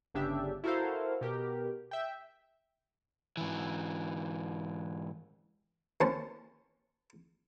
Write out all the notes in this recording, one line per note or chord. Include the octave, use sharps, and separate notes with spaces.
G1 C#3 D4 G4 E5
E4 F#4 A4 A#4 C5 F5
B2 G4 A#4
E5 G5
G#2 E3
D#2 C#4 C5 A5